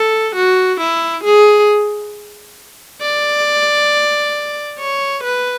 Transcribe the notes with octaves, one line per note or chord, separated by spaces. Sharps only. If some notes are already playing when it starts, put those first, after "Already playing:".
Already playing: A4
F#4
E4
G#4
D5
C#5
B4